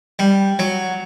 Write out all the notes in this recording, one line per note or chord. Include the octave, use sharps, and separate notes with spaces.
G3
F#3